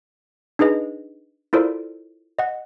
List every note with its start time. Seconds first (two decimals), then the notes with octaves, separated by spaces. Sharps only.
0.59 D4 D#4 G#4 B4 D#5
1.53 E4 F4 A4 A#4 C5 D5
2.39 D#5 F#5